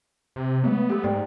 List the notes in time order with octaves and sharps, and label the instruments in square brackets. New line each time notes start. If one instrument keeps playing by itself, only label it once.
[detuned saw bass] C3
[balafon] F#3 G#3 A3 [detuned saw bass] B3
[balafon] G4 A4
[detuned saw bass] G#2 [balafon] D5 G5